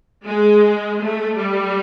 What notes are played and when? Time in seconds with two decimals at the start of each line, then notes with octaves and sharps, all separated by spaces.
0.25 G#3
1.00 A3
1.37 G3